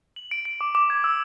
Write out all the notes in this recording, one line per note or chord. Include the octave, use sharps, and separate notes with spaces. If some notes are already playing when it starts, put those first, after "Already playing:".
F#7
D7
D7
D6
D6
G#6
E6